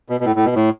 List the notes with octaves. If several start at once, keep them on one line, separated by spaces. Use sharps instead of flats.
B2
B2
A2
A2
B2
A2